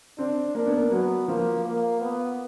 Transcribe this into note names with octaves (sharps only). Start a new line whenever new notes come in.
C4 D4
A#3 D4
B3
A#3
F#3 B3
F3 A#3
A#3
B3